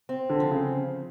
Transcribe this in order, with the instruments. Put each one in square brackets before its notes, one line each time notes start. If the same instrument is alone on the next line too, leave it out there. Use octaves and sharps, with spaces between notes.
[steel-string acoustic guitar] C4
[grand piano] D3
[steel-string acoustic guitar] F3
[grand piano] C#3